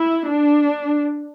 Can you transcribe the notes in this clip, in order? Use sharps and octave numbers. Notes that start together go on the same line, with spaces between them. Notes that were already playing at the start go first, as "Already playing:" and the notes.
Already playing: E4
D4